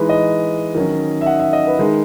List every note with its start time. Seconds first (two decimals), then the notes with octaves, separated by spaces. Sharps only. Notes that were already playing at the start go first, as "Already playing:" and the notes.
Already playing: E3 G#3 D#4 B4
0.09 D#5
0.75 D#3 F#3 C#4
1.21 E5
1.26 F#5
1.40 E5
1.53 D#5
1.67 B4
1.79 D#3 G#3 D#4